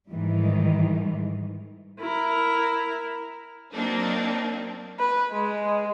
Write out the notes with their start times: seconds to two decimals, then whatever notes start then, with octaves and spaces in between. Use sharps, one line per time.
0.12 G#2 D#3 E3 G3
2.00 E4 A#4
3.72 F#3 A#3 C4 D4 D#4
4.99 B4
5.32 G#3